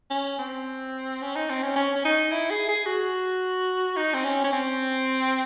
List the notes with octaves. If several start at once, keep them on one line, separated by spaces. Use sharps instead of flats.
C#4
C4
C#4
D#4
C4
C#4
C#4
C#4
D#4
E4
G#4
G#4
F#4
D#4
C4
C#4
C#4
C4